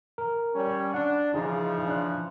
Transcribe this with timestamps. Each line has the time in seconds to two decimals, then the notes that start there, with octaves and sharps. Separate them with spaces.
0.18 A#4
0.54 G3 C#4
0.94 D4 F#5
1.34 C#3 E3 F3 D#4 G#4 D#5
1.87 D4 F#6